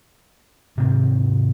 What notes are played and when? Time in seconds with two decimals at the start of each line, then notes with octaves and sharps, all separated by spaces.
0.77 G#2 C3 D#3 C4